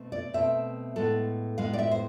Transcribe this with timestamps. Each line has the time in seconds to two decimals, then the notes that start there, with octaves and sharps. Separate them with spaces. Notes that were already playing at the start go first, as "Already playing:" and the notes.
Already playing: B2 A3 C4
0.12 D5
0.34 B2 A3 C4 E5
0.96 A2 G#3 B3 A4
1.58 A2 G#3 B3 F5
1.73 D5
1.79 E5
1.91 C5